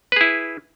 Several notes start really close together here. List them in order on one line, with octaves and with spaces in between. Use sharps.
B4 G#4 E4